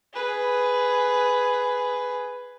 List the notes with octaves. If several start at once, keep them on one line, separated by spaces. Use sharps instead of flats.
G#4 B4